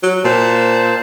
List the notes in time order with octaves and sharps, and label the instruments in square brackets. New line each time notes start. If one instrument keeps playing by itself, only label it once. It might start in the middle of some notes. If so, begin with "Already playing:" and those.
[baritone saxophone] F#3
[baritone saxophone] A#2 [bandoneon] C5 A5